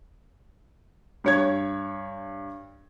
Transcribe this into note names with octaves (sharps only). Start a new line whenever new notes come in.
G2 C#5 G#6